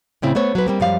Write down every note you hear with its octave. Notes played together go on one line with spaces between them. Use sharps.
A2 C#3 C4 E4
A3 B3 C5 C#5
F#3 B4
G3 A#3 C4
F#2 F3 G3 F5